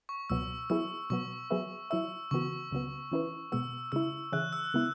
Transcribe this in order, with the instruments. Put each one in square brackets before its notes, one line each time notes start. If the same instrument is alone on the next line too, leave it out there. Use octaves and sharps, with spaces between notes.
[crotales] C#6
[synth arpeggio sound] C#2 B2 F#3 B3 [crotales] E6
[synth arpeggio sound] F#3 B3 E4 G#4 [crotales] E6
[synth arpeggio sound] B2 F#3 B3 [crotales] C#6
[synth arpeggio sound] F#3 B3 G#4 B4 E5
[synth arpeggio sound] F#3 E4 B4 E5 [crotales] E6
[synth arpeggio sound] C#3 E3 B3 F#4 [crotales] C#6
[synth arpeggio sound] C#2 C#3 F#3 B3
E3 C#4 E4 B4
[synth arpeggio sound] B2 G#3 B3 [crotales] E6
[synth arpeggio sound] C#3 G#3 E4 [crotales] E6
[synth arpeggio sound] C#3 E3 C#4 G#4 E5 [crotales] F#6
[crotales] E6
[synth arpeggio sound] C#3 G#3 B3 E4